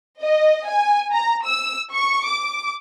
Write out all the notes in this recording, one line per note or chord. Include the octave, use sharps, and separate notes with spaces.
D#5
G#5
A#5
E6
C#6
D6